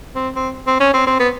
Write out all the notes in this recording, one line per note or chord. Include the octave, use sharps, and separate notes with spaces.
C4
C4
C4
C#4
C4
C4
B3